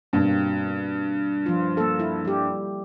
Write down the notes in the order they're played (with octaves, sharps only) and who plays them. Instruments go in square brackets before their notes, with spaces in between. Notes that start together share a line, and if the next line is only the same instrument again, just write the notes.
[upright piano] G2 [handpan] B2 A#3 C4
[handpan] F3 F4
A#3 A4
E4
G3 G4